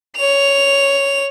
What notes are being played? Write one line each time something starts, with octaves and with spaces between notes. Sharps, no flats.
C#5 F7